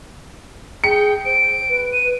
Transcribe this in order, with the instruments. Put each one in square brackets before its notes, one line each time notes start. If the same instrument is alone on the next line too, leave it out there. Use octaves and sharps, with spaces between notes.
[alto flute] G#4 [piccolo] G5 [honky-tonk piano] C#7
[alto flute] C5 [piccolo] D7
[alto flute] B4
[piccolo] D#7